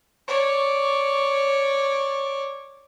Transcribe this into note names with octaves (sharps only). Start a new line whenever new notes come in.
C#5 D5